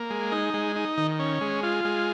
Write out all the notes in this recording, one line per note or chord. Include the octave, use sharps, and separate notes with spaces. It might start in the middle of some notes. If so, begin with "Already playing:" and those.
Already playing: A#3
G#3
D#4
G#3
D#4
D#3
C#4
G#3
F4
G#3